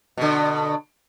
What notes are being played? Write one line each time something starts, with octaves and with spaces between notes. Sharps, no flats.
B2 D3